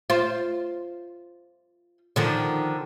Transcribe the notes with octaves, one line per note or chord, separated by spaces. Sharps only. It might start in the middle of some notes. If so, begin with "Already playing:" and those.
F4 C5
D3 D#3 F3